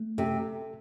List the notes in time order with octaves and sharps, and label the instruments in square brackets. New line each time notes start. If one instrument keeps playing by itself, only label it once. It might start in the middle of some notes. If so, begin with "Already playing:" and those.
Already playing: [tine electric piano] A3
[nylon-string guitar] C3 [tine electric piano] A4